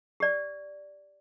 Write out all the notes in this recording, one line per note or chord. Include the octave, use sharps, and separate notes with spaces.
G4 D5